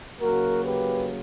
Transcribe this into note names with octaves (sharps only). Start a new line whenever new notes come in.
C#3 F#3 A#3 F#4 A#4
G4 B4